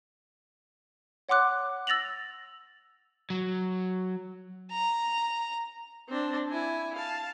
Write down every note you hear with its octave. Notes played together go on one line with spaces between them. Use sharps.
C#5 F#5 C6 D6 F#6
E6 A6 A#6 F7 F#7
F#3
A#5
C4 D4
E4 G#5
F5 A5